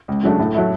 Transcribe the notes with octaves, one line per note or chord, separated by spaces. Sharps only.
C#2
C#3 F#3 A3 D4
A2
F#3 A3 E4